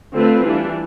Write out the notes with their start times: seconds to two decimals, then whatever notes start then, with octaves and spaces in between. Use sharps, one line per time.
0.15 D3 A3 C4 F4 B4
0.45 E3 G3 D4